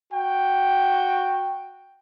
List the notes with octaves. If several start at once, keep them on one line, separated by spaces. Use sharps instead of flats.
F#4 G5